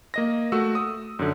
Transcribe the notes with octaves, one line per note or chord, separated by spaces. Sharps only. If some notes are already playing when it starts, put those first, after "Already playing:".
A#3 D#5 A#6
A3 F#4 E6
D#6
F#2 D3